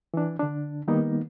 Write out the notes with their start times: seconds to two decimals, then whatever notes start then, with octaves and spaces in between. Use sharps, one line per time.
0.14 E3 D4
0.40 D3 D4
0.88 D#3 G3 A#3 B3 D#4